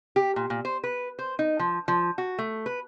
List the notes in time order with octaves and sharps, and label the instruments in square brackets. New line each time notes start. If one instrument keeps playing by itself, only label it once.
[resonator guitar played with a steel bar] G4
A#2
A#2
C5
B4
C5
D#4
F3
F3
F#4
A3
B4